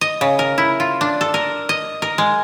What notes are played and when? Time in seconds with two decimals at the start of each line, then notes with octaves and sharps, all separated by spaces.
0.01 D#5
0.21 C#3
0.39 A#4
0.58 E4
0.80 F4
1.01 D4
1.21 A4
1.34 A#4
1.69 D#5
2.02 A#4
2.18 G#3